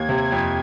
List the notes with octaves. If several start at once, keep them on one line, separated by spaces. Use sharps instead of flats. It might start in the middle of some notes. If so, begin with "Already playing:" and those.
Already playing: D#2 G#6
C3
F2